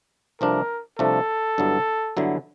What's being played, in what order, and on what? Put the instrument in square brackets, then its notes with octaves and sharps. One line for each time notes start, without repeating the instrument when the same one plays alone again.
[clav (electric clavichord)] C2 C3 F3 A3 D4 [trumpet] A#4
[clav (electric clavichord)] C2 C3 F3 A3 D4 [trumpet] A4
[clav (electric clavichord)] G2 D3 F#3 B3 E4
G2 D3 F#3 B3 E4